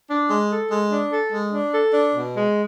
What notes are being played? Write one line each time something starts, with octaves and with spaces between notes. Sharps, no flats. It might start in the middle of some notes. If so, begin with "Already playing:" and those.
D4
G#3
A4
G#3
D4
A4
G#3
D4
A4
D4
B2
G#3